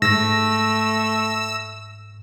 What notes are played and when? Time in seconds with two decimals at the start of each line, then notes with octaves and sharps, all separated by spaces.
0.02 G#2 A3 E6 A#6